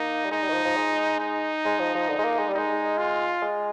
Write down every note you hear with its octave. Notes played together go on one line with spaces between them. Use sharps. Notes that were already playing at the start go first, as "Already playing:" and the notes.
Already playing: A#3 D#4
G3
G#3 D#4
G3
D#3
F3
F3
G#3
D#4
G#3
F3
F3
D3
G#3
A#3
G#3
G3
G#3 D#4
F4
G#3